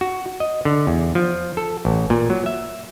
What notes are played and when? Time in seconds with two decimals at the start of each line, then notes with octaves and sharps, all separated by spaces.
0.01 F#4
0.40 D#5
0.65 D3
0.87 E2
1.15 F3
1.57 A4
1.85 A1
2.10 A#2
2.30 F#3
2.46 E5